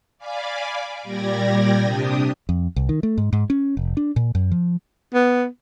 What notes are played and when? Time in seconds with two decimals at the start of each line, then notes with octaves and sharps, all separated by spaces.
0.18 D5 F5 G#5 B5 D6
1.03 A#2 G3 G4 D5 G#6 A#6
1.82 C3 D4 G4 D#6
2.49 F2
2.76 C2
2.89 D#3
3.03 A3
3.18 G#2
3.33 G#2
3.50 C#4
3.77 F1
3.97 D4
4.16 A#2
4.35 F#2
4.52 F3
5.14 B3